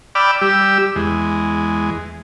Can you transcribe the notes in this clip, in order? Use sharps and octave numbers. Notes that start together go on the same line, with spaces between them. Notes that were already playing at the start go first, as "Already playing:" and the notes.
D5 G5 B5 D6 E6 F6
G3 G4 E6
E2 G#3